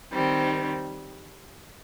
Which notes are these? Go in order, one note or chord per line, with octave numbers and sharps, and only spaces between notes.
D#3 G3 C4